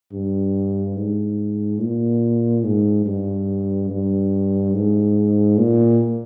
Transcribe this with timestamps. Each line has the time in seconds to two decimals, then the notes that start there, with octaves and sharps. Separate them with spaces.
0.12 G2
0.96 G#2
1.80 A#2
2.64 G#2
3.06 G2
3.90 G2
4.74 G#2
5.58 A#2